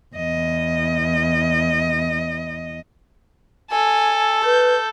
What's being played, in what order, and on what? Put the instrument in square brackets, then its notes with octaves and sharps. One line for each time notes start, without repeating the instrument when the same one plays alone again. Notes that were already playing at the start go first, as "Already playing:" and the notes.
[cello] E2 D#5
[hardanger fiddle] A4 [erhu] G#5
[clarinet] B4 [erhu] G6